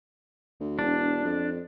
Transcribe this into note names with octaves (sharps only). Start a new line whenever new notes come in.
D2
E1 D4
F2